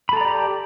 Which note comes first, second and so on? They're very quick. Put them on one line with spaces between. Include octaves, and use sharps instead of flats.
B5 A4 A#5 D5 G4